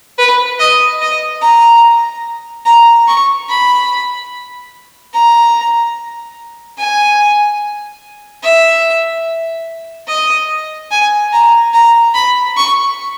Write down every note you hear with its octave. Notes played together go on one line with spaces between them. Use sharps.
B4
D#5
D#5
A#5
A#5
C#6
B5
A#5
G#5
E5
D#5
G#5
A#5
A#5
B5
C#6